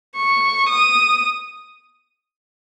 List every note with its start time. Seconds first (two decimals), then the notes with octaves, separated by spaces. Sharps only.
0.17 C#6
0.69 D#6